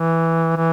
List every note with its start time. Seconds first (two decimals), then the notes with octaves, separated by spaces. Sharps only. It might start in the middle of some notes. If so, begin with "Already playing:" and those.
Already playing: E3
0.56 E3